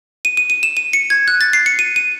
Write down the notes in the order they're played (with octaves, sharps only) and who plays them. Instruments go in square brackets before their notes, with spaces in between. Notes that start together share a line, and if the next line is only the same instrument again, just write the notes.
[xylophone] D#7
D#7
D#7
E7
D#7
C#7
G#6
F#6
A6
C7
C#7
D#7
D#7